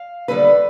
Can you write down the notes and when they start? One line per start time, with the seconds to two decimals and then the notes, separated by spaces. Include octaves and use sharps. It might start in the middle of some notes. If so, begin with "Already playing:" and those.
Already playing: F5
0.28 D#2 D3 G3 B3 B4